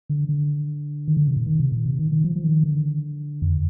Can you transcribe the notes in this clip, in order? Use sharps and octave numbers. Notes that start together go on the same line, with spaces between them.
D3
D3
D#3
D3
C3
A#2
D#3
C3
A#2
C3
D#3
D#3
F3
F3
D#3
D3
F2